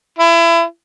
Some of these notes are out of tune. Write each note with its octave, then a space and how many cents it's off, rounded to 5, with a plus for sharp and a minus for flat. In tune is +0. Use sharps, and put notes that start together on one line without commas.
E4 +30